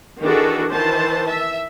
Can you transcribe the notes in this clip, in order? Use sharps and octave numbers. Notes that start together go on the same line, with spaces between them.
D#3 E3 D4 F#4 G#4 A4
D#3 E3 C5 A5
E5